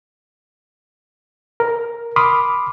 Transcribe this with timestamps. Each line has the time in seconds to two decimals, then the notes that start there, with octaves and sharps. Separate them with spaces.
1.60 A#4
2.16 B5 C6 D6 D#6 F6